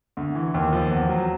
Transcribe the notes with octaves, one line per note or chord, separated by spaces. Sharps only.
D2
E3
D#2
F3
E2
F#3